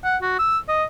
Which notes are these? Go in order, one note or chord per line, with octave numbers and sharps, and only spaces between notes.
F#5
F#4
E6
D#5